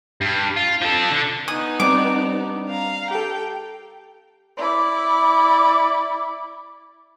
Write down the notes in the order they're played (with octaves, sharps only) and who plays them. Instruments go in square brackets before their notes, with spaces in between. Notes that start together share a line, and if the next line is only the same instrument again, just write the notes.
[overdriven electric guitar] G2
F4
F3 A4
D3
[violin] B3 D#4 [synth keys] G#5 F#6 G#6 [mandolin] D#6
[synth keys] G3 C4 D4 [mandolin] D6
[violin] F5 A#5
[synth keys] G4 A4 [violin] G5
[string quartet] E4 D5